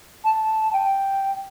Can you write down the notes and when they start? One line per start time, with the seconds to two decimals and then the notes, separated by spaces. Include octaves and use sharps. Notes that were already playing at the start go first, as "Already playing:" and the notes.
0.24 A5
0.73 G5